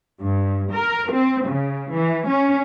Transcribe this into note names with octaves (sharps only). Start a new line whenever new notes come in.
G2
A#4
C4
C#3
E3
C#4